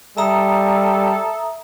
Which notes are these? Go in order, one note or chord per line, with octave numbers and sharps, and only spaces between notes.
G3 A4 E5 A#5 D#6